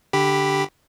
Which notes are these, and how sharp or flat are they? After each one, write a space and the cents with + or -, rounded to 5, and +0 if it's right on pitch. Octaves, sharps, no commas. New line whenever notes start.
D3 +0 G4 +0 B5 +0